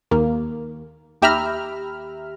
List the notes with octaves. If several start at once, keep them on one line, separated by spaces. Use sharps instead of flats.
D#2 A#3
D#2 G4 E5 A#5 B5 F6